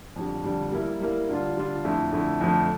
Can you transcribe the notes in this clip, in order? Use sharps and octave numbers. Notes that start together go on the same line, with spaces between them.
F2 D3 G3
F2 D3 G3
G3 A#3 E4 A#4
G3 A#3 E4 A#4
D3 G3 D4 F4
D3 G3 D4 F4
F2 D3 A3 E4
F2 D3 A3 E4
F2 D3 F3 A3